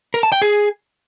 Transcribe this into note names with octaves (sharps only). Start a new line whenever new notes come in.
A#4
A5
G5
G#4